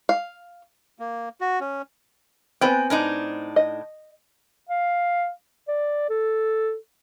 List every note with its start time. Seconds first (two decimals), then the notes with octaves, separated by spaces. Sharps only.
0.09 F5
0.99 A#3
1.41 F#4
1.61 C#4
2.61 B3 C4 B4 G5 G#5
2.90 A2 D4 D#4
3.56 D#5
4.69 F5
5.68 D5
6.10 A4